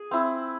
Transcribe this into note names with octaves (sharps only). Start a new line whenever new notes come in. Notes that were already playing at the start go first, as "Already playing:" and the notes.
Already playing: G#4
C4 E4